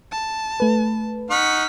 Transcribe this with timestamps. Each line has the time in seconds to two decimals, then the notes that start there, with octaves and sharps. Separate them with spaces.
0.12 A5
0.60 A3 B4
1.30 D#4 F#5 C#6 F6 B6